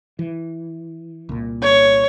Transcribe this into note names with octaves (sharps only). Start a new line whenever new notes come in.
E3
C2 A#2
C#5